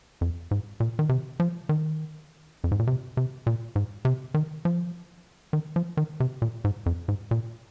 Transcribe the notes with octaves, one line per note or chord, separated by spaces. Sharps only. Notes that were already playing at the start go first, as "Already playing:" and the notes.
F2
G#2
A#2
D#3
C3
F3
D#3
F2
G#2
A#2
C3
C3
A#2
G#2
C3
D#3
F3
D#3
F3
D#3
C3
A#2
G#2
F2
G#2
A#2